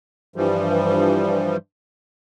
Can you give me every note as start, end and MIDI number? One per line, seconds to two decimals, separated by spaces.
0.36 1.57 43
0.36 1.57 52
0.36 1.57 53
0.36 1.57 55